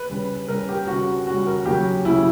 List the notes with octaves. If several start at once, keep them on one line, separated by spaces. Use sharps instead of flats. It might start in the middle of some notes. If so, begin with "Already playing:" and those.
Already playing: B4
C#3 G3
C#3 G3 A#4
G4
C#3 G3 F#4
C#3 G3 F#4
A#4
C#3 F#3 G4
C#3 F#3 E4